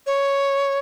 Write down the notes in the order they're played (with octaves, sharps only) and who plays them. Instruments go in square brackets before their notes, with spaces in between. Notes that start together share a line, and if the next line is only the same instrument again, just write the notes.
[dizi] C#5